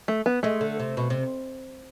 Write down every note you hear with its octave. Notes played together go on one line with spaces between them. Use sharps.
A3
B3
G#3 A3
D3
C3
B2
C3